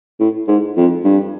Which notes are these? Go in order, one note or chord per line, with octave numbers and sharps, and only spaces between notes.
A2
G#2
F2
G2